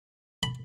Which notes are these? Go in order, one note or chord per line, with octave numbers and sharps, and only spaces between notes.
B5